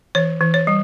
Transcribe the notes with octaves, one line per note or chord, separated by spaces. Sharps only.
E3 C#5
E3
C#5
G3